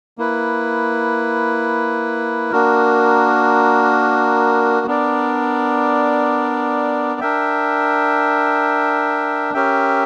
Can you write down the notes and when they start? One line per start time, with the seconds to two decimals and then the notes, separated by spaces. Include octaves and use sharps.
0.18 A#3 E4 B4
2.52 A#3 D4 F#4 A#4
4.86 B3 D4 A#4 D5
7.21 D4 A#4 E5 G5
9.54 C#4 G4 A#4 E5 G5